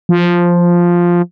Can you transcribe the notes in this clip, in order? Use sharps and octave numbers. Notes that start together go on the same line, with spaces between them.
F3